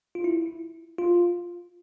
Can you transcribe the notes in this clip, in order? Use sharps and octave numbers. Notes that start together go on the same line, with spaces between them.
F4
E4
F4